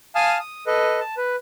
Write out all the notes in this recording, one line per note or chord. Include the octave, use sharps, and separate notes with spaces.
F5 G#5 A5 D#6 F6
D#6
A4 B4 D#5
A5
B4